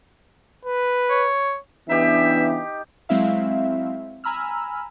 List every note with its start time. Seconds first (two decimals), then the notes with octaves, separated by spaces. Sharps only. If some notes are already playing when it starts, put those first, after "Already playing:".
0.65 B4
1.10 C#5
1.89 C#3 E3 B3 D4 D#4 G4 E5
3.09 F#3 G#3 C4 E4 E5 F5
4.24 G#5 A#5 B5 E6 F6